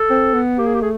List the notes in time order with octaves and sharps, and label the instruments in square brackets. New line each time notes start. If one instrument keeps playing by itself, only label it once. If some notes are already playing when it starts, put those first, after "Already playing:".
Already playing: [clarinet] A4
[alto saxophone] C4
B3
[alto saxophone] A#3 [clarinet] G4
[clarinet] G#4
G4
[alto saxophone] A3 [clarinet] G#4